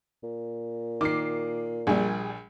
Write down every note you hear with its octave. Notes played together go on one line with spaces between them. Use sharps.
A#2
D#3 D6 C7
A#1 G3 G#4